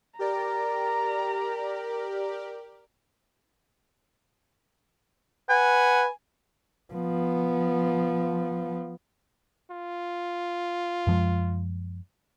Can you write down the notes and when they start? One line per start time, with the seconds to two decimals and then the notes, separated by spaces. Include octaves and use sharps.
0.19 G4 A#4 D5 A#5
5.49 B4 F#5 G#5
6.93 F3 B3
9.71 F4
11.07 F#2 F3 G#3